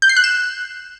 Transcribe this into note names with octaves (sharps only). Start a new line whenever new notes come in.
G6
C7
F#6
E7